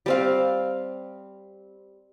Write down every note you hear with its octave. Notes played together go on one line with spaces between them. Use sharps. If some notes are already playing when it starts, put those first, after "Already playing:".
G3 C4 F5